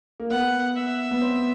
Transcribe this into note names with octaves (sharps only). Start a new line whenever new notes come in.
A#3
B3 F#5
E5
B3
C4